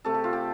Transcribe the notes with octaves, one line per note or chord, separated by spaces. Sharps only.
C3 A3 A4
G4
F4
G4